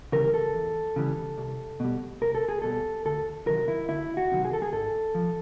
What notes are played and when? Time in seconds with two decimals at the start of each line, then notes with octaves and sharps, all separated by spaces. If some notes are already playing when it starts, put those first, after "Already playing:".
0.12 C#3 E3 G3 A#4
0.34 A4
0.54 E2
0.96 C#3 E3 G3
1.38 C2
1.80 B2 G3
2.21 C2 A#4
2.35 A4
2.49 G#4
2.62 B2 G3 A4
3.05 D2 A4
3.47 C3 D#3 F#3 A#4
3.68 E4
3.89 D2 E4
4.17 F#4
4.31 C3 D#3 F#3
4.45 G#4
4.53 A4
4.62 G#4
4.73 G#2 A4
5.15 F3